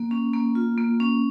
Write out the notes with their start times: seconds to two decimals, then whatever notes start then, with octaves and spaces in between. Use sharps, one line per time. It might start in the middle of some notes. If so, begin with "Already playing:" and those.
Already playing: A#3
0.11 C#4
0.33 A#3
0.55 F4
0.78 A#3
1.00 C#4